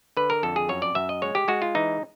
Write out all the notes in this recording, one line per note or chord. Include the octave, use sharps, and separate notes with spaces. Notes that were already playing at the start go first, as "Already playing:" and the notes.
D3 B4
A#4
F2 A4
G#4
F#2 C#5
D5
F#2 E5
D#5
G#3 C#5
G4
G#3 F#4
F4
E3 D#4